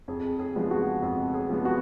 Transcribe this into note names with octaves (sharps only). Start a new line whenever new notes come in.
F2 G#4
G#4
F3 G#3 B3
F#4
F2
G#4
F3 G#3 B3
F#4